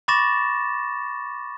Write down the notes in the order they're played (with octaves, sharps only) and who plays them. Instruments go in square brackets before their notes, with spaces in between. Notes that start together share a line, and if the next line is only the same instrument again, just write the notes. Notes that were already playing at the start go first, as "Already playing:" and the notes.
[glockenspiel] B5 C#6 D6 A6 A#6 E7